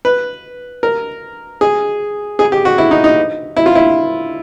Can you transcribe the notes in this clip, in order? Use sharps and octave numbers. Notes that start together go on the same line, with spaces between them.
B4
A#4
G#4
G#4
G4
F#4
E4
D#4
D#4
E4
F4
E4